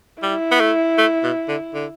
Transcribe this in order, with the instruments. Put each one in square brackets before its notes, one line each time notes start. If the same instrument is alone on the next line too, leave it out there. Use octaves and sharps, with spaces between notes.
[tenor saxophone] G3 [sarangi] E4
[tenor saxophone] B3
A3
A3
B2
D3
D3